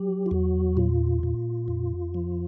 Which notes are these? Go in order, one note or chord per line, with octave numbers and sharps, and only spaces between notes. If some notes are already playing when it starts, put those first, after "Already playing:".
Already playing: F#3 G4
F4
E2 F#4
A#2 F4
A#2
F2
F3